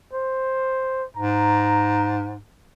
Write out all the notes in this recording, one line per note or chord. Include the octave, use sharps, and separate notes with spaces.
C5
G#2 A#5